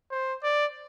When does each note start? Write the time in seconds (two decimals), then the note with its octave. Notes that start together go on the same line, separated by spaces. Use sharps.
0.11 C5
0.43 D5